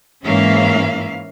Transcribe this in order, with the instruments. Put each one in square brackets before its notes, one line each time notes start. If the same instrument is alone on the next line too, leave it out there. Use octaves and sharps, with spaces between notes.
[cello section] G#2 E3 A#3 C#4 E5 F5